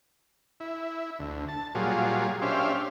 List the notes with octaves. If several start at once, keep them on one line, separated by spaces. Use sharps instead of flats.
E4
D2
A5
A#2 F#3 G3 F4 G#4
C#4 D4 G4 C5 E5 F5